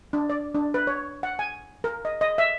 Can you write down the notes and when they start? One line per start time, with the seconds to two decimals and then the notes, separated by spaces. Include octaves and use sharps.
0.13 D4
0.30 D5
0.55 D4
0.74 B4
0.87 C#5
1.23 F#5
1.39 G#5
1.84 A#4
2.05 D#5
2.21 D#5
2.38 E5